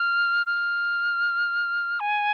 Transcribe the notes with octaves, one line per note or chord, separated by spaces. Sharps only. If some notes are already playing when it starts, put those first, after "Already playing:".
Already playing: F6
F6
G#5